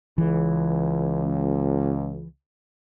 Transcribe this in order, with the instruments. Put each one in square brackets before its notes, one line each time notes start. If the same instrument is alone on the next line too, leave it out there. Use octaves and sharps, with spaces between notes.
[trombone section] C#2 [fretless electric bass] E3